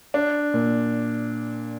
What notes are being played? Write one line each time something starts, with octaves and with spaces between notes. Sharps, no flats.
D4
A#2